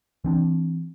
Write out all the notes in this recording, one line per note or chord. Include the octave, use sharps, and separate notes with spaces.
E3 C4 D4